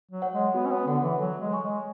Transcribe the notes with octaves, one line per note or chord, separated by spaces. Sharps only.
F#3
C#5 F#5
G#3
B3 F#4
C#4
B3
D3 C#5 F#5
E3
F#3 A4
G#3
C#5 G#5 C#6
G#3